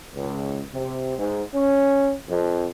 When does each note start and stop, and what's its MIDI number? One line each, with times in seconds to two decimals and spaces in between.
0.16 0.63 37
0.74 1.18 48
1.19 1.44 44
1.55 2.13 61
2.30 2.69 41